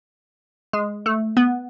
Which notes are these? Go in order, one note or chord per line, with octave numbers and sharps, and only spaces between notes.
G#3
A3
B3